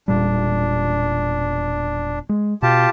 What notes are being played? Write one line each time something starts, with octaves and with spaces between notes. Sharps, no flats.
E1 A#2 G3 D4
G#3
B2 F4 G4 A5